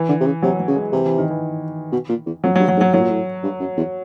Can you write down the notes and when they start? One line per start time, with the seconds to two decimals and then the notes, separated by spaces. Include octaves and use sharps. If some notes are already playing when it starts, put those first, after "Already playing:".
Already playing: E3
0.09 D3
0.21 C3
0.26 C#3
0.42 C3 F#3
0.59 F#3
0.68 C#3
0.76 G#3
0.92 C3 E3
1.06 E3
1.18 D#3
1.30 E3
1.92 B2
2.09 A#2
2.26 E2
2.43 F2 F#3
2.56 F#3
2.60 G2
2.68 F#3
2.77 G#2
2.81 F#3
2.93 A2 F#3
3.01 A#2
3.10 A2
3.43 G2
3.60 F#2
3.77 E2